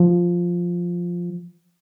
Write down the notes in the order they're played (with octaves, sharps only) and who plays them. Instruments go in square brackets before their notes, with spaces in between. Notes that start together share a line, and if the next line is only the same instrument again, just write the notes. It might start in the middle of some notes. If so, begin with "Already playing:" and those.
Already playing: [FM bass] F3